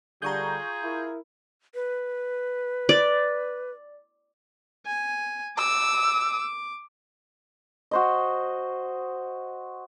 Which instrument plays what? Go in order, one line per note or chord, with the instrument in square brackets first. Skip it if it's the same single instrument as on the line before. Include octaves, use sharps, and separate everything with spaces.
[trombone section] D3 G3 [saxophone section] F4 G#4 [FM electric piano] A#5 C#6 G6
[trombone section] E4 A#4
[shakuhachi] B4
[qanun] D5
[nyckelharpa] G#5
[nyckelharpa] D6 [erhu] E6
[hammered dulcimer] F#4 C5 D#5